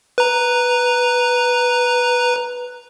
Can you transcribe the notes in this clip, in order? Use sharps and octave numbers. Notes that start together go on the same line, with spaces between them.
B4 A#5